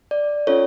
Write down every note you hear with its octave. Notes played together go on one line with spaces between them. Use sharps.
D5
C#4 F4 A4 C#5